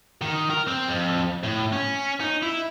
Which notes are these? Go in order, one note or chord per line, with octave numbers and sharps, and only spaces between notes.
D#3
A#4
C4
F2
A2
C#4
D#4
E4